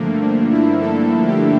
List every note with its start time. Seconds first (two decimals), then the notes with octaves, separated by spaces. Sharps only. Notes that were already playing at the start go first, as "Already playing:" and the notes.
Already playing: G2 D3 F3 A3 A#3
0.21 D4
0.52 E4
0.81 A4
1.27 G4